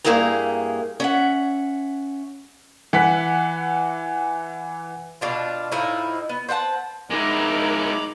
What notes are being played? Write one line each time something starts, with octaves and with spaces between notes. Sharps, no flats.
G2 A3 A#3 E4 G#4 A#5
C#4 E5 F#5
E3 F#5 B6
B2 D4 F4
A2 F3 D#4 E4
B3
C4 B4 F#5 A5
G#3 D#4 E4 A#4 A#5 B5 D6